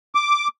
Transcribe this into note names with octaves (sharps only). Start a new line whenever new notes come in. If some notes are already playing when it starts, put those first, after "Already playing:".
D6